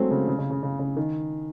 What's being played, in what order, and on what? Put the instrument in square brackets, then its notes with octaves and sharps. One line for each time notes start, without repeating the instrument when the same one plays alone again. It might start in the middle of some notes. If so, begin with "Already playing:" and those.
Already playing: [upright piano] F#3 G#3 A3 C4
C#3
C#3
C#3
C#3
C#3
C#3
D#3